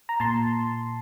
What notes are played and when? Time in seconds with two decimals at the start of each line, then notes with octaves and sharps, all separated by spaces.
0.09 A#5
0.20 A#2 A5 C6